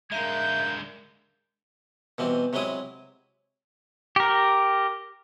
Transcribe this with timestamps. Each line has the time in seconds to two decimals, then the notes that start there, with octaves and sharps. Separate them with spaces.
0.12 D3 G#3 A#4 E5 F5 A#5 G6
2.18 B2 E3 G3 C4
2.53 C3 F#3 G#3 E4 D#6
4.16 G4 A#4